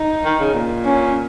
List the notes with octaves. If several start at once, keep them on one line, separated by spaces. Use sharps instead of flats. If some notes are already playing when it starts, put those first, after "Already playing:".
Already playing: D#4
D#3
C#3
A#2
C#4